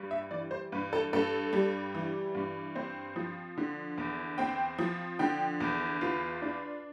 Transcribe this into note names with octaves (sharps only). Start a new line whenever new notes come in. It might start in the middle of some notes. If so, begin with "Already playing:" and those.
Already playing: G2 G3
E5
E3 D5
C5
G2 B4
A4
G2 A4
G3
E3
G2
C4 C5
F3
D3
E2
C4 G5
F3
D3 G5
E2
F4 B4
D4